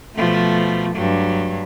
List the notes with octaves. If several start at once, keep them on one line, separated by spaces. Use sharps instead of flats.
B2 F3 A3
G2 F#3